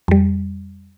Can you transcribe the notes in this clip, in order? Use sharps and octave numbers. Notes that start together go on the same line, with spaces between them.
F2 G3